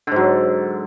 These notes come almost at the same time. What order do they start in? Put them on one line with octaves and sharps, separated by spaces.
D3 G#2 F#3